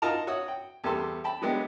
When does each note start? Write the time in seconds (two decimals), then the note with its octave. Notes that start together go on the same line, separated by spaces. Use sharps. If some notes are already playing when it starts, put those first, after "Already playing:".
0.02 D#4 F4 F#4 A#4 A5 A#5
0.27 F#4 C#5 F#5 D#6
0.48 G5
0.84 E2 G3 B3 A4 C6
1.24 G5 A5 B5
1.42 F#3 G#3 B3 D4 G4